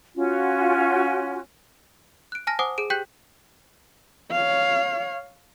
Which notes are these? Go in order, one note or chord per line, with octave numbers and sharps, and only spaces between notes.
C#4 F4 F#4
F#6 D7
G#5 A5 F6 A#6
C5 F#5 G#5 D6 D#6
G#4 D7
G4 G5 F#6 G6 B6 F#7
C#5 F5